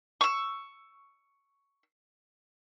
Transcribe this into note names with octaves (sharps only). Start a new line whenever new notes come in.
C#6 E6